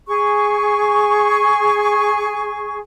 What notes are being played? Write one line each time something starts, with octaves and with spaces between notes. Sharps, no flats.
G#4 C#6